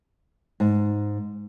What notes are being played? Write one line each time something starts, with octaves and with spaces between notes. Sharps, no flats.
G#2